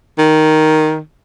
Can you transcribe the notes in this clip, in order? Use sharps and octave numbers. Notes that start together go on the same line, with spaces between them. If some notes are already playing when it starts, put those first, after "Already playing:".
D#3